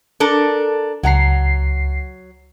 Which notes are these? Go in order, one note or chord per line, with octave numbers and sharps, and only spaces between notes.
D4 A4 A#4
C#2 F#3 F#5 A#5 C7